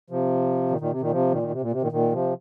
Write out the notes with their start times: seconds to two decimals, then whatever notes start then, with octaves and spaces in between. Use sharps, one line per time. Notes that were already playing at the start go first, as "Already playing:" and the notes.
0.10 C3 F3
0.70 A#2 D#3
0.80 A#2 D#3
0.91 C3
1.01 A#2 D#3
1.11 C3 F3
1.31 A#2 D#3
1.42 D#3
1.51 C3
1.61 A#2
1.72 C3
1.82 A#2 D#3
1.92 A#2 D#3
2.12 C3 F3